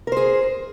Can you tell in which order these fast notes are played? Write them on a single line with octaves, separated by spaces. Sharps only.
A#4 C5 G#4